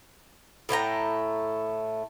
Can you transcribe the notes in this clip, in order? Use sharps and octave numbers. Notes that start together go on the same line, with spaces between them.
A2 A3 G5 A#5